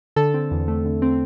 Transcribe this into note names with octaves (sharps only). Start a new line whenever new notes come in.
D3 A4
C4
E2
A3
D3
C4